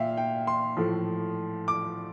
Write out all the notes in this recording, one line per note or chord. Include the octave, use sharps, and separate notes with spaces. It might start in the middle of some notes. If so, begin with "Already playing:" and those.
Already playing: A#2 E5 F5 G5
G5
C6
A2 F3 A3
D6